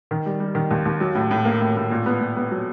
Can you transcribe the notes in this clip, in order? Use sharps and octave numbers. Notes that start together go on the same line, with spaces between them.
D#3
G3
G3
D#3
D#2
D#2
F#3
A2
A2
A#3
A2
A2
A#2
B3
A#2
B3
F#3